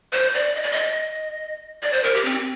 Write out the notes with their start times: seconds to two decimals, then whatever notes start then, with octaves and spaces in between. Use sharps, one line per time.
0.13 C5
0.34 D5
0.56 D#5
0.63 D5
0.72 D#5
1.83 D5
1.93 C5
2.04 A#4
2.14 G4
2.25 C4